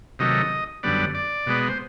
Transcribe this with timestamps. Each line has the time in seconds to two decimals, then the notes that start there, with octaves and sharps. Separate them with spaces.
0.19 C3 D#3 F#3 A3 D#5
0.83 F#2 D3 G3 B3 D5
1.15 D5
1.46 B2 G#3 B3
1.69 C5